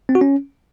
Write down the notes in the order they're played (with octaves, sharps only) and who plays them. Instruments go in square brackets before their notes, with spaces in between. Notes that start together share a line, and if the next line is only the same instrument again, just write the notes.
[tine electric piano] C4
F#4
C#4